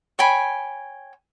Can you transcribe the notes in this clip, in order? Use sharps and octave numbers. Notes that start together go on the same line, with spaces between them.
C#5 G5 G#5 B5